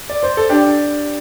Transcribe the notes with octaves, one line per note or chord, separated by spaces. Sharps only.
D5
C5
A4
D4 G4